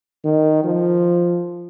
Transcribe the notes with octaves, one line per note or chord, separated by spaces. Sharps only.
D#3
F3